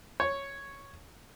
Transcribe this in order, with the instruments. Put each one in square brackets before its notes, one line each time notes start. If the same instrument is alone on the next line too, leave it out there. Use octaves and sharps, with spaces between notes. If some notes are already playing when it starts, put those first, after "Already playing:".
[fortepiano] C#5